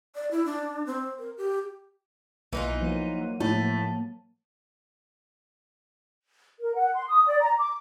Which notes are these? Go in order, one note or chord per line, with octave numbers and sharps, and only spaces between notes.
D5
E4
D4
C4
A#4
G4
B1 E3 A#3 D#4 F4
F3 F#3 D#7
A2 A3
A#4
F#5
C6
D#6
D5
A#5
D6